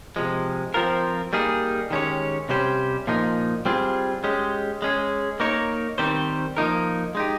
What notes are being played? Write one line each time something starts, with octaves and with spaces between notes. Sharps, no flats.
C3 F3 G#3
F3 C4 F4 A#4
G3 A#3 D#4 G#4
D#3 G#3 C#4 G4 C#5
C3 G3 C#4 G4 C5
A#2 F3 A#3 D#4
G3 C4 F4 G#4
G#3 C#4 G4
G#3 C#4 G#4
A#3 D#4 A#4 C#5
D#3 G3 C4 G4 C5
F3 A#3 D#4 A#4
G#3 D#4 G4